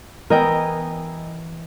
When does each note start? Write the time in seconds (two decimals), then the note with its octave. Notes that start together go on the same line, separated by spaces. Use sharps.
0.30 E3 B3 A#4 D#5 G5